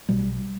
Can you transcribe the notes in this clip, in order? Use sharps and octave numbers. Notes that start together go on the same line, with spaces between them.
B1 B2 G3